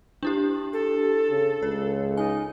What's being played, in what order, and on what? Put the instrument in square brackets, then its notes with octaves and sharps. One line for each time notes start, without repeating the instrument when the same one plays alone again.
[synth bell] D4 E4 G4
[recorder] A4
[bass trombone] C#3
[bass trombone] C#2 [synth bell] C#5
[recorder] D#4 [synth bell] G#5